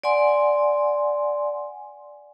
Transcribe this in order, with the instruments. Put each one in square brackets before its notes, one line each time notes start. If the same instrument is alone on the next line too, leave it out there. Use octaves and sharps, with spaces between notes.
[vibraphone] D5 F#5 G#5 C6